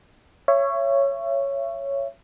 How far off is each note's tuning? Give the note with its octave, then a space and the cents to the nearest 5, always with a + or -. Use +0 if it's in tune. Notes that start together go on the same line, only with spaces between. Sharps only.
C#5 +0 E5 +35